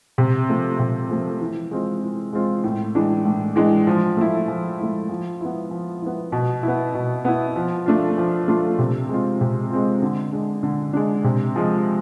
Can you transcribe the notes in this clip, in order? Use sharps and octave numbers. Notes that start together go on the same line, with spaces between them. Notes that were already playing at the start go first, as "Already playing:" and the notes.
C3
F3 A3
C3
F3 A3
E3
G#3 C4 F4
E3
G#3 C4 F4
A2
E3 G#3 D4
A2
E3 G#3 D4
F3
A3 E4
F3
A3 E4
F3
B3 E4
F3
B3 E4
B2
E4
B3
B2
B3 E4
F3
A3 D4 F4
F3
A3 D4 F4
C3
G#3 C4 F4
C3
G#3 C4 F4
D3
G#3 D4
D3
G#3 D4
C3
F3 G#3